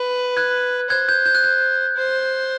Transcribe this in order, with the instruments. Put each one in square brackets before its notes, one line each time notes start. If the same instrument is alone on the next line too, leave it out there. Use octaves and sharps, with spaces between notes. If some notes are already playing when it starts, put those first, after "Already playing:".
Already playing: [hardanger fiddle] B4
[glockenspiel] F#6 G#6
[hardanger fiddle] C5 [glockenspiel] F#6 G#6
[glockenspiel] G6
G6
F#6
G6
[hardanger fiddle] C5